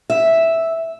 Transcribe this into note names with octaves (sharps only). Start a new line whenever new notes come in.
E5